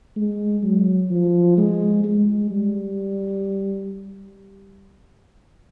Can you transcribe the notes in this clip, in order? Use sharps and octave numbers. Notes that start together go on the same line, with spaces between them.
G#3
F#3
F3
G#3
G#3
G3